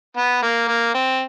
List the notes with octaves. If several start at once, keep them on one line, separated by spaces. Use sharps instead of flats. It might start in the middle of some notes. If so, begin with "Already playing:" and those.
B3
A#3
A#3
C4